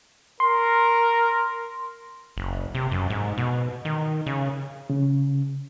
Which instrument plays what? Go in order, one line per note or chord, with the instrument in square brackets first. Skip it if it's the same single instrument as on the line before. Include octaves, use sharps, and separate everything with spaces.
[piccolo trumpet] A#4 [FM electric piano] C6
[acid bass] F#1
C3
F#2
G#2
B2
D#3
C#3
[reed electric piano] C#3